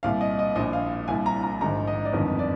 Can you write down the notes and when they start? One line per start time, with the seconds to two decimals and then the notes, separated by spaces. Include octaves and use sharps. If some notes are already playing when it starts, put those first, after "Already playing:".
0.03 C2 A#2 F5
0.21 D#5
0.39 D#5
0.56 A#1 A#2 D#5
0.73 F5
1.08 C2 A#2 G#5
1.26 A#5
1.43 A#5
1.61 A#1 G#2 D#3 A#5
1.87 D#5
2.05 D5
2.13 G1 F2 D#3 D#5
2.39 D5